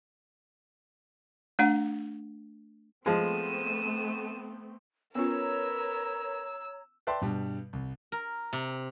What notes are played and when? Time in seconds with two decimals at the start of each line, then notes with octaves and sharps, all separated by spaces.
1.59 A3 D4 F#5
3.06 F3 G#3 A3 B3 C4 D#7 E7
5.15 B3 C#4 F4 A#4 B4 C#5 A#5 E6
7.07 B4 D5 E5 G5 A5 C6
7.21 G2 B2 G3
7.73 C2
8.12 A#4
8.53 C3